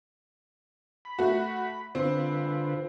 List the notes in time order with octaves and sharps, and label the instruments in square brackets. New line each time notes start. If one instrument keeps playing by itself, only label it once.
[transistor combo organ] B5
[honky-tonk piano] A3 F#4
[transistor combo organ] D3 F4 B4 [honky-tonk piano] C4